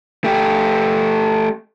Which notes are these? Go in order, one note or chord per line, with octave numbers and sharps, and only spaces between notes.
A3 G4